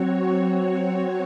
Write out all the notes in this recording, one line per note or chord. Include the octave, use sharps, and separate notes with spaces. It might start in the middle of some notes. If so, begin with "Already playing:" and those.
Already playing: F#3 C4 F#4 C#5